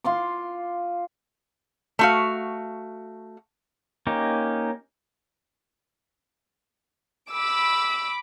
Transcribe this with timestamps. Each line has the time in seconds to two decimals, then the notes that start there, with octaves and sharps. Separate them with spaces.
0.04 F4 C6 D6
1.99 A3 F#4 F5
4.07 A#3 C#4 D#4 G4
7.32 B5 D6 E6